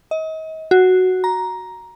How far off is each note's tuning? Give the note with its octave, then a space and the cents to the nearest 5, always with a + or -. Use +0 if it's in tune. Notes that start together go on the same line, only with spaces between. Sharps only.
D#5 +35
F#4 +0
A#5 +10